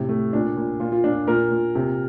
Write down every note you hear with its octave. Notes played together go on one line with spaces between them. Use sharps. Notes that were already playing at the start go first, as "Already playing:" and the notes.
Already playing: A2 C3
A3
A#2 D4
A#2
A#2 F4
F4
A#2 D4
A#2 A#4
A#2
C3